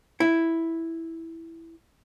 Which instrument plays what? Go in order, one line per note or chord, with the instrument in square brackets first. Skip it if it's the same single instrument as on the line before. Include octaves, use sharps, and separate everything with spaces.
[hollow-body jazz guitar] E4